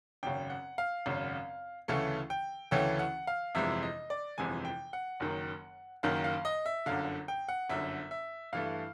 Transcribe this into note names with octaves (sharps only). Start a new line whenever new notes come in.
G#1 F#2 C#3 G5
F#5
F5
G#1 F#2 C#3
D2 C#3 E3 A3 C#4
G5
D2 C#3 E3 A3 C#4 G5
F#5
F5
G1 F2 C3 E3 G#3 E5
D#5
D5
G1 F2 C3 E3 G#3 G#5
G5
F#5
F#1 F#2 D#3
F#1 F#2 D#3 F5
F5
D#5
E5
G1 F#2 D3 F5
G5
F#5
G1 F#2 D3 E5
E5
G2 E3 A3 F5